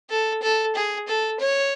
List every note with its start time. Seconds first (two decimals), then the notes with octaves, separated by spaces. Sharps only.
0.10 A4
0.42 A4
0.75 G#4
1.07 A4
1.40 C#5